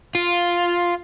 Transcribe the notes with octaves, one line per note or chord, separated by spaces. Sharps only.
F4